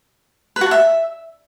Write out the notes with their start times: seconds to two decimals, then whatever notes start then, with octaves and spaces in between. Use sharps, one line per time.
0.56 B4
0.61 F#4
0.66 A5
0.71 E5